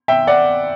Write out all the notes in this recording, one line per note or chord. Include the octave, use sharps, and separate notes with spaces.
E5 G5
D5 F#5